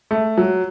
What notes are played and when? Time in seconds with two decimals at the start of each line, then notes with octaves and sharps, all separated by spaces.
0.11 A3
0.37 F#3